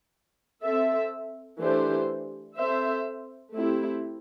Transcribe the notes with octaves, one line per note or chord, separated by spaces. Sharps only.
C4 A4 E5
E3 A3 D4 G4 C5
C4 A4 C5 E5
A3 C4 E4 G4